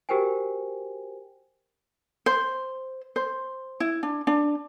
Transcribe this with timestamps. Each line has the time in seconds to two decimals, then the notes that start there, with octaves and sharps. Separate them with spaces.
0.09 F#4 G4 A#4 C5 G5 G#5
2.26 C5
3.16 C5
3.80 E4
4.03 D4
4.27 D4